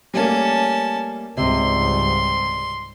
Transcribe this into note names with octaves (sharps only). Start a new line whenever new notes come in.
G3 A3 A#3 C#4 A5
C#2 G#2 C3 G3 D#5 C6